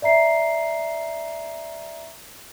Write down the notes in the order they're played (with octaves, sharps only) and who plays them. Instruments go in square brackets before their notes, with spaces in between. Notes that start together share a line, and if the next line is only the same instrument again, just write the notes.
[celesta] D5 E5 A#5 C7